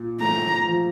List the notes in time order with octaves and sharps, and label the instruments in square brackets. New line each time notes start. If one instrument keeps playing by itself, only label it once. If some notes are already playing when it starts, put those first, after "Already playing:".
Already playing: [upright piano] A#2
[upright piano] A3 [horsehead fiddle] A#5
[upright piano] F3